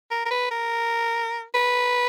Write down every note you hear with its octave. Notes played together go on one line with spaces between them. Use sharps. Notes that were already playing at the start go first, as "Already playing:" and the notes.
A#4
A#4
B4
A#4
B4